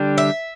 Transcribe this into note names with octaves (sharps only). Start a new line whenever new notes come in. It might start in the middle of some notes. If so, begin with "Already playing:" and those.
Already playing: D3 G3 D4 G4
E5